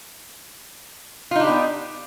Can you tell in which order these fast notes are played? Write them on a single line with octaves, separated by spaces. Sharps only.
F4 D#4 D4 G4 B3